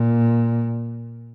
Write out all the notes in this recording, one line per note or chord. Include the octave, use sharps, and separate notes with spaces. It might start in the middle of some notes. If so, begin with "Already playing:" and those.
Already playing: A#2